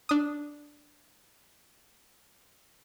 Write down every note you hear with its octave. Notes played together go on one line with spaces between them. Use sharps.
D4 D#6